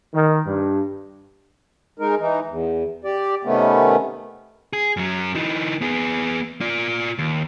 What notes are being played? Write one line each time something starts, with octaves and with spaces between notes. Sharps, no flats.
D#3
G2
G#3 D#4 A#4
E3 D#4
E2
G4 D5
C3 D#3 A3 B3 C#4
G#4
F#2 F#3
E3 D#4
B3 G#4
F4 D5
D#2